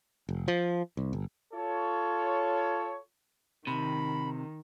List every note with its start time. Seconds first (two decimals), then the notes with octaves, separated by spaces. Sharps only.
0.29 F1
0.48 F3
0.97 C2
1.13 G1
1.54 F4 A4 C#5
3.67 C3 D#3 B5